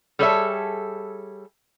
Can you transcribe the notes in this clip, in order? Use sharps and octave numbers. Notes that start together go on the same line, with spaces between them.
G3 G#4 A4 C#5 D5 E5